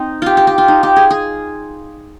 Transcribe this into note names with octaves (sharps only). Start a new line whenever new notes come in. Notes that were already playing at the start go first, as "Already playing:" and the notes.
Already playing: C4 D#4
F4 G4
G4
G4
F4
D#4
G4
G#4
G#4